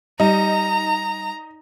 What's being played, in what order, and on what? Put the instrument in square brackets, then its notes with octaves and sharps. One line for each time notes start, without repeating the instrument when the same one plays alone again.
[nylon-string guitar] G3 [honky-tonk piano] D#4 [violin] A#5